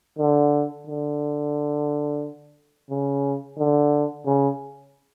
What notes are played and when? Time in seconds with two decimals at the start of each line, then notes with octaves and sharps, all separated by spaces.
0.19 D3
0.87 D3
2.90 C#3
3.58 D3
4.26 C#3